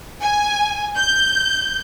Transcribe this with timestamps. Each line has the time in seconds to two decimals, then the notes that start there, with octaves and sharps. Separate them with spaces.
0.21 G#5
0.98 G6